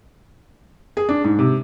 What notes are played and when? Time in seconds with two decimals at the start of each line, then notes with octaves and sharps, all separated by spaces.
0.97 G#4
1.09 D4
1.24 G#2
1.39 C3